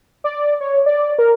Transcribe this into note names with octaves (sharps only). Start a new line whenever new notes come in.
D5
C#5
D5
A#4